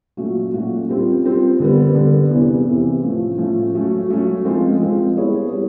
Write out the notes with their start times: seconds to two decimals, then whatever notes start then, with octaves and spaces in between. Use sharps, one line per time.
0.17 A#2 F#3 A3 C#4 F#4
0.53 A#2 F#3 A3 C#4 F#4
0.89 G3 C4 F4
1.25 G3 C4 F4
1.60 D3 G3 B3
1.95 D3 G3 B3
2.30 E2 C3 E3
2.66 E2 C3 E3
3.02 A2 F3 A3 C#4
3.38 A2 F3 A3 C#4
3.74 F#3 A3 C#4
4.09 F#3 A3 C#4
4.44 F3 G#3 C4 F4
4.80 F3 G#3 C4 F4
5.15 G3 B3 E4 G#4 C#5
5.51 G3 B3 E4 G#4 C#5